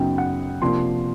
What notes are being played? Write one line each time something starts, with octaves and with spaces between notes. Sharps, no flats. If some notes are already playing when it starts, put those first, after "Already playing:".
Already playing: F#2 C#3 F#3 B3 D#4 G5
F#5
C3 F3 A#3 D4 C6